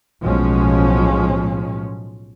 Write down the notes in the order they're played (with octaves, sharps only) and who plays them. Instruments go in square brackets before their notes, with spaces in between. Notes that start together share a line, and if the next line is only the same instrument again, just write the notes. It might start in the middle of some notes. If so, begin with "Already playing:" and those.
[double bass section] B1 A2 F3 G#3 C#4